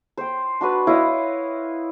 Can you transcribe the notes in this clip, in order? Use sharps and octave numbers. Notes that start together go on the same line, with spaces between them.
C5 G5
D4 F#4 B4 D5
E4 C#5 D#5 F5